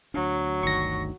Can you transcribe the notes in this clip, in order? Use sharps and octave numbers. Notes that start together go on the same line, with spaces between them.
D2 F#3 D4
G1 D2 D#3 C#6 A#6